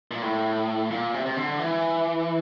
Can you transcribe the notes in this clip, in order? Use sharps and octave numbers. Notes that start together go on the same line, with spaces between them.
A#2
A2
A#2
C3
C3
D3
E3